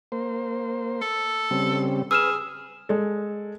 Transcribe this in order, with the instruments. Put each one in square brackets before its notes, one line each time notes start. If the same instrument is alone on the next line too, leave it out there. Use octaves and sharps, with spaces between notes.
[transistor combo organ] A#3 C5
[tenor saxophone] A4
[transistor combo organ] C#3 G3 C4
[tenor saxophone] G#4 [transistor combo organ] B4 [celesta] E6 F6 E7
[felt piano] G#3 A4